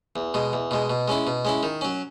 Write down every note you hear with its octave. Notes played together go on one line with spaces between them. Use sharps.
E2
B2 G#3
E2
B2 G#3
B2
G#3 C#4 E4
B2
G#3 C#4 E4
D#3
F#3 C#4